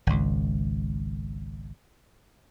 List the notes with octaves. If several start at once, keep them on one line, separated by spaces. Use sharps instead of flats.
G#1 C#2